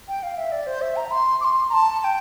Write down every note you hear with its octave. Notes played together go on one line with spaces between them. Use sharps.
G5
F5
E5
D5
C5
E5
A#5
C6
D6
C6
A#5
A5
A5
G5